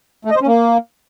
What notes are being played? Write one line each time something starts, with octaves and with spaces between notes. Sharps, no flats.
A3
D#5
C5
C#4
A#3